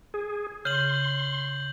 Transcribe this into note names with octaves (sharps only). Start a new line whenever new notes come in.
G#4
C#3 C6 G6 F#7